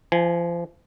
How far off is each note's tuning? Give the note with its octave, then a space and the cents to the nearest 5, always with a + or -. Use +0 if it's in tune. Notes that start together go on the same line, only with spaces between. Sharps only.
F3 -30 G#5 +0